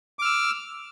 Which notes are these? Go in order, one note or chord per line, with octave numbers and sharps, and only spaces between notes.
D6 E6 F6